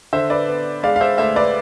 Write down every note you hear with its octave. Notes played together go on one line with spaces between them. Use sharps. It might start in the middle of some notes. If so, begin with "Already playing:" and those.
D3 C5 E5
B4 D5
B3
G#3 D5 F5
F5
C5 E5
D2 C5 E5
B4 D5